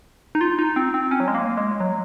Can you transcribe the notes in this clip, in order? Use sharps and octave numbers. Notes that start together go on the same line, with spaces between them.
D#4
F4
D#4
C4
C4
C#4
F#3
G#3
A#3
G#3
F#3